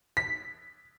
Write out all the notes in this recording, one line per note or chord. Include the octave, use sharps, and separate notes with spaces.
B6